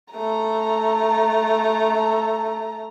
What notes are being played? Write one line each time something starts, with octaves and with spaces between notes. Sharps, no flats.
A3 A#5